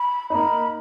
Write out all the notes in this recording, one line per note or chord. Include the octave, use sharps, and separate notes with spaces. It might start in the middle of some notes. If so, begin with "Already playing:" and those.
Already playing: B5
A#3 D#4 B5